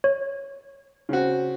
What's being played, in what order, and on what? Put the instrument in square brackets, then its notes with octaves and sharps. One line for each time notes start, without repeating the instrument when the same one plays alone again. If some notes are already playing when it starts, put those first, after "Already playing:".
[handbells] C#5
[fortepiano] C#3 C4 F#4